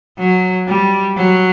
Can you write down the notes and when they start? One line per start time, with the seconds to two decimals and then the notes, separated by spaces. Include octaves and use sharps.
0.18 F#3
0.68 G3
1.17 F#3